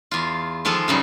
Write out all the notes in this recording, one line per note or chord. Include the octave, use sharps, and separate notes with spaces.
E2 F4
D#3 F3 G#3 F4 A4
F#2 C#3 G3 D#4